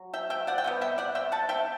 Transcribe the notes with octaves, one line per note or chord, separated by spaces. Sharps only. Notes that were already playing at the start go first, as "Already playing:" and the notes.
Already playing: F#3
E5 G5
E5 G5
D5 F#5
G5
C3 G3 B3
E5 G5
D5 F#5
E5 G5
F#5 A5
E5 G5